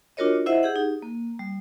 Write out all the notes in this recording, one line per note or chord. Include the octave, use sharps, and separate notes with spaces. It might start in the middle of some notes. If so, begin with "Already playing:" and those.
D4 F4 F#4 A#4 C#5 D#5
E4 C5 D#5 E5 F#5
G4 G#4 F#5
D#4
A#3
G3